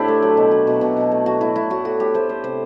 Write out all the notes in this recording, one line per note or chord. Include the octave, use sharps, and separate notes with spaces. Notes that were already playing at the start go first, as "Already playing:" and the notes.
Already playing: A2 C4 D4 E4 G4
A3
F#3
B2
F#3
B2
B2
B2
A3
F#3 F#4
A2 E4
A3 E4
A2 F#4
A2 F#4
A2 G4
A3 C5
A3 C5
C3 C5